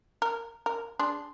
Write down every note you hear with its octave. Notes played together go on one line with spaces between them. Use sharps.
A#4
A#4
D4 G#4 C6